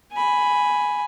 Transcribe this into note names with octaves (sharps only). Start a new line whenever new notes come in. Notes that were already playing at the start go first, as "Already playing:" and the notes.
G#5 B5